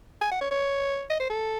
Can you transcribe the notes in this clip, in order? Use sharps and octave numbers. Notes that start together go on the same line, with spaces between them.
G#5
F#5
C#5
C#5
D#5
C5
A4